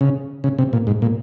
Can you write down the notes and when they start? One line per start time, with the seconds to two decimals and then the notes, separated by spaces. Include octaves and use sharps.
0.01 C#3
0.44 C#3
0.59 C3
0.73 A#2
0.87 G#2
1.02 A#2